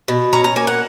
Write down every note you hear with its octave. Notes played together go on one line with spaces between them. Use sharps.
B2
C#4 A#5
A#5
A#3 G#5
F#5